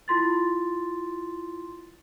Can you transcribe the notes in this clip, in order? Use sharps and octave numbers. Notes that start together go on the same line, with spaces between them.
E4 F4 C6 A6